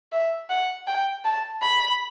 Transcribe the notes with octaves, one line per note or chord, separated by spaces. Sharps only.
E5
F#5
G5
A5
B5